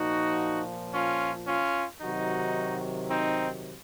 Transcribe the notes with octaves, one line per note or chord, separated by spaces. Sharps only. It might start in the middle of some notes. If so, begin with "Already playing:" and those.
Already playing: A#2 F3 D#4 F#4
C#4 F4
C#4 F4
C3 D#3 F#3 D#4 F#4
C4 D#4